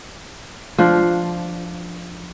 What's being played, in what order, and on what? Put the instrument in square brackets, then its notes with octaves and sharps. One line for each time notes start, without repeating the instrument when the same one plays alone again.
[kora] F3 D4 F4